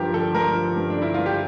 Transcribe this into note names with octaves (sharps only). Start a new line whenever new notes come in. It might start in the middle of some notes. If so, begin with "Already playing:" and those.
Already playing: G2 F3 G4 A#4
D3 A4
G2 A#4
F3
G2
D4
D3
E4
G2 F4
G4